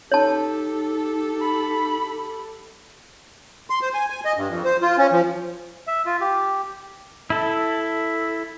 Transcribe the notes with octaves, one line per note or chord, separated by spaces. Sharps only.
D#4 G4 A4 C#5 A5
B5
C6
C5
G#5
G#5
D#5
G2
F2
C5
F4
C#4
F3
E5
F4
G4
E4 A4